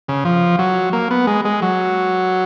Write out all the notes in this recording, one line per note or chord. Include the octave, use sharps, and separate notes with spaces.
C#3
F3
F#3
A#3
B3
G#3
G#3
F#3